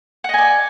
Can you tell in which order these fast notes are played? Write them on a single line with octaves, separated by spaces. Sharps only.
F#5 D#5 G#5 D5